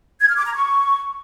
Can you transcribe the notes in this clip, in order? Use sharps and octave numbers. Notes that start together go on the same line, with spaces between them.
G#6
F6
D6
A#5
C#6